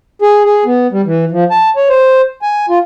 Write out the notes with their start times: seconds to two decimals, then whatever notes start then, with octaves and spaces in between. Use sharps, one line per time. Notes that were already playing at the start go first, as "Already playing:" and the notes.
0.22 G#4
0.44 G#4
0.65 B3
0.92 G3
1.06 E3
1.31 F3
1.51 A5
1.76 C#5
1.90 C5
2.42 G#5
2.69 F4